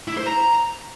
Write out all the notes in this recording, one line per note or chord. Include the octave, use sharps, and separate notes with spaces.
E4
C5
A#5